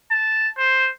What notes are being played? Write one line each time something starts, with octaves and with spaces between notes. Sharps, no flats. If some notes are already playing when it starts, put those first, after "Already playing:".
A5
C5